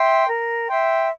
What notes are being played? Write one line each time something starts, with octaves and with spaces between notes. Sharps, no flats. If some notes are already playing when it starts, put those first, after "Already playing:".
Already playing: E5 G5 C6
A#4
E5 G5 C6